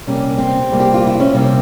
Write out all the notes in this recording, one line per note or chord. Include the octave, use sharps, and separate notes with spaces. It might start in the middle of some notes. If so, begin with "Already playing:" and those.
C3 G3 A#3 C#4
C4
C3 G3 A#3
G4
F4
E4
C#4
C3 G3 A#3 C4